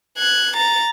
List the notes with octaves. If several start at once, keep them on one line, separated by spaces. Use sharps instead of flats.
F#6 G#6
A#5 A6